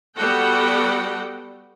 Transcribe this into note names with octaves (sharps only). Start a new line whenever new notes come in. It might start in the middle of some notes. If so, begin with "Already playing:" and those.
G3 B3 F#4 A4 F#5 G5